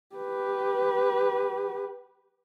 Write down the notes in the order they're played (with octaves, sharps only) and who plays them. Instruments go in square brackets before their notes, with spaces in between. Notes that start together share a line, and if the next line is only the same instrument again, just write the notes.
[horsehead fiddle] G4 B4